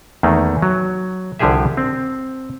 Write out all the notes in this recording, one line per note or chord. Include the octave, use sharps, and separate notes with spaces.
E2 D#3 A3 A#3
F#3
C2 D3 F3 G4 G#4 E5
C4